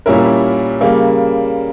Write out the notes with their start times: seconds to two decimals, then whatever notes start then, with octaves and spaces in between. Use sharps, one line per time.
0.06 A#2 G3 C#4 E4 A#4
0.81 C#3 G3 A#3